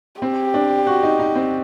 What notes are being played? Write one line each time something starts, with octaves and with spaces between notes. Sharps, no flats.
C4 G4
D4
F#4
D#4
D#4
C4